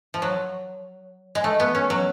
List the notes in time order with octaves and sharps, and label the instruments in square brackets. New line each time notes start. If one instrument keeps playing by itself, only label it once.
[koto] F3
F#3
G#3
A3
B3
C#4
F#3